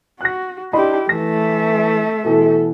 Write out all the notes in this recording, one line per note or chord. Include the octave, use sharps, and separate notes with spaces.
F#4 F#6 A#6
D4 E4 G4 D#5 B5 C6
E3 A3 E5 A#6
B2 E3 A4